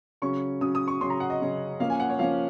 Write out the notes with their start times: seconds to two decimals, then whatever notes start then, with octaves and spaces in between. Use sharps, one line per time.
0.22 C#3 F#3 C#4 C#6
0.61 C#3 F#3 C#4 D#6
0.75 D#6
0.88 C#6
1.01 C#3 F#3 C#4 C6
1.10 A#5
1.20 F#5
1.30 D#5
1.41 C#3 F#3 C#4
1.80 F3 A#3 C#4 F5
1.90 G#5
2.00 F#5
2.10 C#5
2.19 F3 A#3 C#4 F5